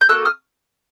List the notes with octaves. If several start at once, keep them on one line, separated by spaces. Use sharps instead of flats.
G6
A#3 D#4 F#4 A4 E6 F#6
D#6 F6